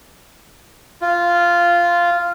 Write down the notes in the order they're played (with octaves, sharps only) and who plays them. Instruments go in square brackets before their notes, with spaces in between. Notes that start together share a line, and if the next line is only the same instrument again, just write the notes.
[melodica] F4